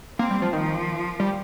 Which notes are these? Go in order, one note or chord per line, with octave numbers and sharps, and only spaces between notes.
A#3 C4
G3
F3
D#3 F3
G3